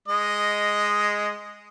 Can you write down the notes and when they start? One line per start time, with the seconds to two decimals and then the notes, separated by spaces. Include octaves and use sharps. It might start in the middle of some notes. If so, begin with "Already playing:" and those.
0.09 G#3 D#5